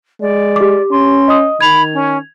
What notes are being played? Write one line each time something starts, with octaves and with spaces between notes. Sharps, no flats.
G#3 D5
G4 D6
C#4 C6
D#5 D#6
D#3 B5 G#6 F7
C#4